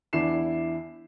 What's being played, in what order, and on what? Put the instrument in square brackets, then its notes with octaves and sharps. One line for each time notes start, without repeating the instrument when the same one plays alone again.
[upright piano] E2 D4 E4 C7 E7